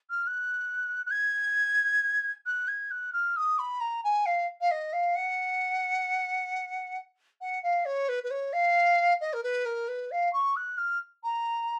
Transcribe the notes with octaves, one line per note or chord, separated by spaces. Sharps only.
F6
F#6
F#6
G#6
F#6
G#6
F#6
F6
D#6
B5
A#5
G#5
F5
F5
D#5
F5
F#5
F#5
F5
C#5
B4
B4
C#5
F5
D#5
A#4
B4
A#4
B4
F5
C#6
F#6
F6
A#5